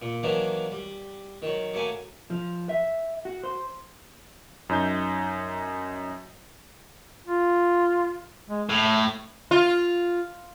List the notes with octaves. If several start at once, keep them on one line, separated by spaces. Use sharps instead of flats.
A#2
D#3 E3 F#3 A#3 D4
G3
D#3 F#3
F#3 A3 A#3 G#5
F3
E5
F#4
C5
F#2 D#4 G6
F4
G#3
A2 A3
F4